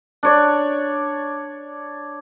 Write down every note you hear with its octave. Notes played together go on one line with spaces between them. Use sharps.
D4 C#5 D5